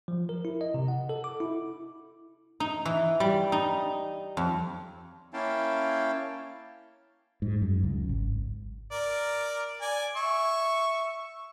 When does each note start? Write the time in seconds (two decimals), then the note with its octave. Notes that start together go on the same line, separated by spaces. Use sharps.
0.08 F3
0.29 A#4
0.45 E4
0.61 D#5
0.74 C3
0.88 F#5
1.09 A4
1.24 D6
1.40 E4
2.60 D#4
2.85 E3
3.20 G3
3.52 D#4
4.37 F2
5.34 A#3 C#4 E4 F5 G5 A5
7.42 G#2
7.62 F#2
7.84 C#2
8.09 G#1
8.91 A#4 D5
9.81 D5 G#5
10.16 E5 C#6